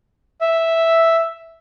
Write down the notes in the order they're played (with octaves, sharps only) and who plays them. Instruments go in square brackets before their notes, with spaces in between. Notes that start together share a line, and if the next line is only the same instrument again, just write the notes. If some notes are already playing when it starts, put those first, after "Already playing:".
[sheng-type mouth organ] E5